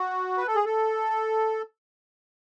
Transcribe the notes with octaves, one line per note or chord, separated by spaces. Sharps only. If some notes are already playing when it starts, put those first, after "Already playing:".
Already playing: F#4
B4
A4
G#4
A4